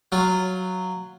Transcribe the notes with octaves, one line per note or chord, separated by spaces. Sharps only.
F#3 F4